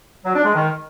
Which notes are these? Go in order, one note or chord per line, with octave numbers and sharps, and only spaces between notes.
F#3
D4
G#3
D#3